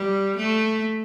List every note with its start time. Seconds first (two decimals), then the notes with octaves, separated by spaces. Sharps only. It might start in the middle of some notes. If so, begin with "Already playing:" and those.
Already playing: G3
0.36 A3